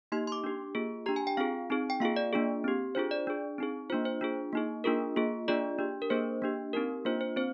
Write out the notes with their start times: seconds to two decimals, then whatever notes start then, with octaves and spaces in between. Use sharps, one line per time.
0.12 A#3 D#4 G4 C6
0.27 C6
0.32 D6
0.44 D4 G4
0.75 A#3 F4 G#4
1.06 D4 G4 A#5
1.16 G#5
1.27 G5
1.37 C4 F4 G#4 F5
1.70 C4 D#4 G#4
1.90 G5
2.00 A#3 F4 G#4 F5
2.16 D5
2.33 A#3 D4 F4 G#4
2.64 C4 G4
2.95 D4 F4 G#4 C5
3.11 D5
3.27 D4 G#4
3.58 C4 D#4 G#4
3.90 F4 C5
3.92 A#3 D4
4.05 C5
4.21 D4 F4 G#4
4.53 A#3 D#4 G#4
4.84 A#3 D4 F4 G#4 A#4
5.16 A#3 F4 G#4
5.48 A#3 D4 F4 G#4 D5
5.79 D4 G4
6.02 A#4
6.10 A#3 D4 G#4 C5
6.42 A#3 D4 G4
6.73 C4 D#4 G4 A#4
7.05 A#3 D4 F4 C5
7.21 C5
7.36 C4 C5